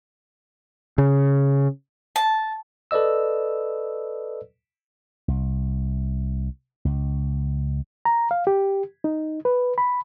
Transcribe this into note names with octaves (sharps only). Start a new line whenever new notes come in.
C#3
A5
A4 B4 D5 D#5 E6
C2
C#2
A#5
F5
G4
D#4
B4
B5